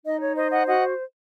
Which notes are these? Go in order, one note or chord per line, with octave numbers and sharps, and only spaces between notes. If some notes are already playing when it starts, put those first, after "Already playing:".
D#4 D#5
C#5
C5 D#5
D#5 F#5
F#4 D#5 F#5